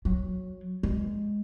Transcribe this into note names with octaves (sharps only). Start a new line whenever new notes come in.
F#3
G#3